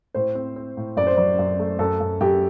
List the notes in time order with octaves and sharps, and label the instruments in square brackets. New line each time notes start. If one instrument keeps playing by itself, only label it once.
[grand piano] A2 [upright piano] C5
[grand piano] C4
C4
A2
[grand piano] F#2 [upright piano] D5
[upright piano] C5
[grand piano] F#3 [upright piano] D5
[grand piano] F#2
A3
[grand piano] F#2 [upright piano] A4
[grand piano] F#2
[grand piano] F#2 [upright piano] G4